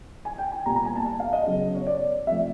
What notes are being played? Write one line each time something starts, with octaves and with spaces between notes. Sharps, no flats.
G#5
G5
G#5
A#2 G3 B3 A#5
A#5
G#5
A5
A5
F5
D#5
C#3 F#3 B3
C#5
D5
C3 F3 A3 E5